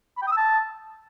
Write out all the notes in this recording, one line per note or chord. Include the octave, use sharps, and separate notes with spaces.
B5
G5
D#6
E6
A5